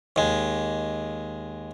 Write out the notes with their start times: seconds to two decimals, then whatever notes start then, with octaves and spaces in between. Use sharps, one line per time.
0.16 D#2 G#3